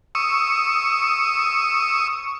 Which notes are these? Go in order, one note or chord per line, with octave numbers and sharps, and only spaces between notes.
C#6 D#6 E6